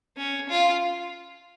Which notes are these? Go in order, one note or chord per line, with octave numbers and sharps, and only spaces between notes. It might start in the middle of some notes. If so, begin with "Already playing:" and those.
C#4
F4